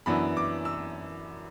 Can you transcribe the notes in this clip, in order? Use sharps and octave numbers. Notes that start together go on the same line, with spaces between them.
F#2 E3 B3 D4 B5
D6
E6